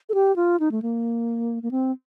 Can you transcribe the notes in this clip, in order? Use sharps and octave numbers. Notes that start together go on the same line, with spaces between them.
A4
G4
F4
D#4
A3
A#3
A#3
C4